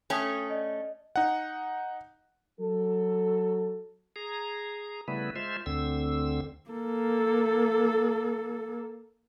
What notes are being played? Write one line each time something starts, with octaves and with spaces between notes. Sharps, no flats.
A3 C#4 G5 D#6
D5 D#5
D#4 F#5
F#3 A4
G#4 A#5
C#3 G3 A3 B3 E4 B4
G#3 F4 C5 E5
D2 D3 C4 E6
A#3 A4